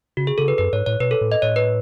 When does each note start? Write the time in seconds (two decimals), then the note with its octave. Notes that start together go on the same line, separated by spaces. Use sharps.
0.17 C#3 F#4
0.27 G#4
0.38 C#3 A4
0.48 B4
0.58 F#2 B4
0.73 G#2 C#5
0.86 A2 C#5
1.00 B2 B4
1.11 A4
1.21 A2
1.32 D#5
1.42 A2 C#5
1.56 B4